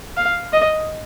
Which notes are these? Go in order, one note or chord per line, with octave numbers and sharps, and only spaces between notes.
F5
D#5